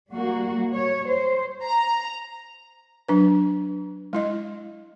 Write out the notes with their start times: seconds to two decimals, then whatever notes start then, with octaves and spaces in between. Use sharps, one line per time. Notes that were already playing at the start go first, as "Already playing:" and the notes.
0.11 G3 A#3 F#4
0.71 C#5
1.06 C5
1.65 A#5
3.08 F#3 D4 B4
4.13 G#3 E4 D#5